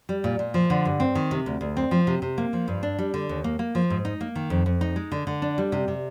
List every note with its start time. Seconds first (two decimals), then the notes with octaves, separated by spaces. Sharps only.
0.09 G3
0.24 A#2
0.39 A#2
0.54 F3
0.70 D3
0.85 G2
1.00 C4
1.15 D#3
1.31 C3
1.46 D2
1.61 D2
1.77 C4
1.91 F3
2.07 C3
2.22 C3
2.38 A#3
2.53 F3
2.68 G2
2.83 D4
2.99 G3
3.14 D3
3.29 D#2
3.44 A#3
3.59 A#3
3.75 F3
3.90 G#2
4.05 D#4
4.21 A#3
4.35 D#3
4.50 F2
4.66 F2
4.81 D#4
4.96 G#3
5.12 D3
5.27 D3
5.42 D4
5.58 G3
5.72 C3
5.88 C3